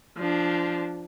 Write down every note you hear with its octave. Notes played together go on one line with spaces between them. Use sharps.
F3 D4